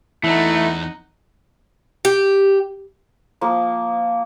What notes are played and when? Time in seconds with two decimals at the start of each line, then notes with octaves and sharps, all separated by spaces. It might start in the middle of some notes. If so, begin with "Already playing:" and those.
0.24 E2 A3 D#4 E4 F#5
2.05 G4
3.41 F3 A#3